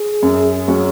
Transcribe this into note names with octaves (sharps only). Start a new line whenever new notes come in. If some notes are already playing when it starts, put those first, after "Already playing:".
Already playing: G#4
F#2
F#3 C#4 F#4